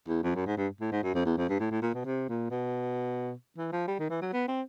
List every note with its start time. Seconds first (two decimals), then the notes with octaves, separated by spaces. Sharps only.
0.08 E2
0.24 F2
0.35 F#2
0.47 G#2
0.57 G2
0.81 A2
0.92 G#2
1.03 F#2
1.14 F2
1.25 E2
1.37 F2
1.49 G2
1.60 A2
1.71 A2
1.82 A#2
1.94 B2
2.05 C3
2.29 A#2
2.51 B2
3.58 E3
3.72 F3
3.88 G3
3.99 D#3
4.10 E3
4.22 F#3
4.33 B3
4.48 C4